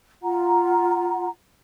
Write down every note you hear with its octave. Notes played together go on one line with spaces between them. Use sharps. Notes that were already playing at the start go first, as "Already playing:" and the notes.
F4 F#5 A#5